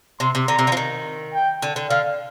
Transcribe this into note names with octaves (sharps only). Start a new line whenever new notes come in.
C3 C6
C3
D3 A#5
C3
D3
F3
D#3
G5
D3
D3
D3 F5